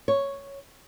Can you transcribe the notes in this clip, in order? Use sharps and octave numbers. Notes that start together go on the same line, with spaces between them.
C#5